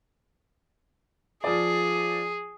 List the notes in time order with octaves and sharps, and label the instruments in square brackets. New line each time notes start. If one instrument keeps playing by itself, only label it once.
[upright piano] F3 D5 [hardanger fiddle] G#4